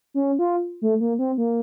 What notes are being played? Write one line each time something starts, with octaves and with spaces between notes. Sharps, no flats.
C#4
F4
A3
A#3
C4
A#3